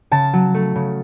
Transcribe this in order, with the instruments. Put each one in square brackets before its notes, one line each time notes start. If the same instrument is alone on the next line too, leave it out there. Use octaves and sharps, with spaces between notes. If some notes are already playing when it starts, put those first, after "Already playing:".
[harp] C#3 A5
F#3
A3
C#3